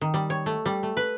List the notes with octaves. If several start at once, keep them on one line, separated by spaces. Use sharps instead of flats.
D#3
G3
C#5
A3
G3
A3
B4